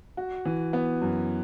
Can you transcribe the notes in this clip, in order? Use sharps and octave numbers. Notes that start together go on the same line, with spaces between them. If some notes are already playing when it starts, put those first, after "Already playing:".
F#4
E3
B3
F#2